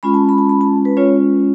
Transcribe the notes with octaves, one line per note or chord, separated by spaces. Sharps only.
G#3 C#4 F4 B5
A5
B5
A5
B5
A5
B4
G#3 C#4 F4 C#5